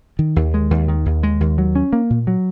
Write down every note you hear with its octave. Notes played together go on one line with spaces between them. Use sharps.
D#3
D#2
G#3
D#2
D#3
D#2
G#3
D#2
F#3
C#4
A#3
A#2
F#3